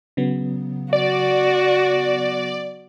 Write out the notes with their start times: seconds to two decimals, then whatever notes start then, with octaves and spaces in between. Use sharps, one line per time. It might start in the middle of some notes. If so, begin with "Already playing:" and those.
0.17 C#3 F#3 B3
0.93 F#4 D5